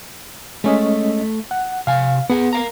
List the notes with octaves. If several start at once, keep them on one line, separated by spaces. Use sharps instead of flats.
G#3 A3 C#4 D#5
F#5
C3 F5 G#5
B3 G#4 F#5
A#4 F5 A#5